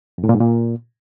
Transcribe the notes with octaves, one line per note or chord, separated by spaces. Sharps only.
F2
A2
A#2
G#2
A#2